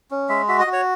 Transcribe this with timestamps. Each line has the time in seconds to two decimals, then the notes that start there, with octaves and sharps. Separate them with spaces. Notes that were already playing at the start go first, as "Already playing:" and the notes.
0.11 C#4
0.29 G#3 E5
0.48 F#4 E5
0.60 D#5
0.67 F#4
0.73 C#5